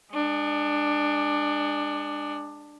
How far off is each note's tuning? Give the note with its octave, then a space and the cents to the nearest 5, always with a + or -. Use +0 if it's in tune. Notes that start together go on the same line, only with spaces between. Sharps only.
G#3 -20 D4 +15